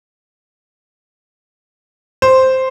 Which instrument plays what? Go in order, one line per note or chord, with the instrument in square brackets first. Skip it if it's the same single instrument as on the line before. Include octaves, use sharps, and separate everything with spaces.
[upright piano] C5